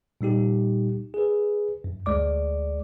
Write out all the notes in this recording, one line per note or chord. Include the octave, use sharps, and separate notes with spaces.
A#2 G3 D#4 G4
G#4 B4
F#2
D2 G#3 D5 D6